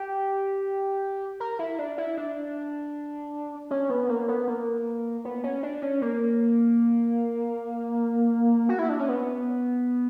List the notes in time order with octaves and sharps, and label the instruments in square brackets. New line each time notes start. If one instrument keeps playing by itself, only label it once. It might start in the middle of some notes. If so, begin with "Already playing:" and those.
Already playing: [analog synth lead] G4
A#4
E4
D4
E4
D4
C#4
B3
A#3
B3
A#3
B3
C#4
D4
C#4
A#3
F#4
E4
D4
C#4
B3